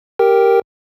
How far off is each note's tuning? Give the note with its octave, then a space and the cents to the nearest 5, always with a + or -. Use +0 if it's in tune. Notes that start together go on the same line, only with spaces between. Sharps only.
G4 +0 A#4 +0 G5 +0